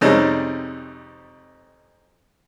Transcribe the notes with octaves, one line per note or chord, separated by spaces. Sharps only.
F2 C3 G3 G#3 C#4 D#4